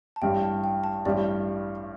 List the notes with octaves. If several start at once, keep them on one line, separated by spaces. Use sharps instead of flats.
A5
A1 G2 G3 G5
A5
G5
A5
A1 G2 G3 D5